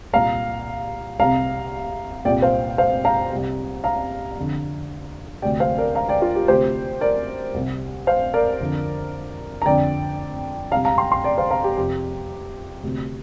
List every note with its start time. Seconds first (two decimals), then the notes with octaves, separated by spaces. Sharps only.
0.13 C2 A#2 F5 A#5
1.19 C2 C3 F5 A#5
2.25 C2 A#2 D5 G5
2.42 C5 F5
2.78 C5 F5
3.05 F5 A#5
3.31 C2 C3
3.84 F5 A#5
4.37 F2 D3
5.42 D2 C3 D5 G5
5.60 C5 F5
5.78 A#4 D5
5.95 F5 A#5
6.09 D5 G5
6.22 F4
6.35 G4
6.48 D2 C3 G4 C5
7.01 A#4 D5
7.54 C2 C3
8.07 C5 F5
8.34 A#4 D5
8.60 F2 D3
9.62 A#5
9.66 F2 D3 D5 G5
10.71 C3 F5 A#5
10.75 C2
10.85 F5 A#5
10.98 G5 C6
11.11 G5 C6
11.24 D5 G5
11.38 C5 F5
11.51 F5 A#5
11.64 G4
11.77 F2 C3 G4
12.83 D2 C3